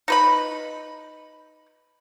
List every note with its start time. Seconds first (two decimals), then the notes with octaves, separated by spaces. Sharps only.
0.08 D#4 B4 B5